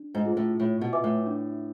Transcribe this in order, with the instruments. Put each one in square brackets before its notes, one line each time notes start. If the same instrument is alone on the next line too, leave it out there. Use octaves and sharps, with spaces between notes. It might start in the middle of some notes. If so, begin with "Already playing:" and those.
Already playing: [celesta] D4
[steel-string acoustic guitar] G#2
[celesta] F4 G#4
[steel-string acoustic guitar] A2
[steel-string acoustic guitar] A2 [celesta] F4
[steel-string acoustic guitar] B2
[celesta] B4 E5 G#5 D6
[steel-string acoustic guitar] A2
[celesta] D4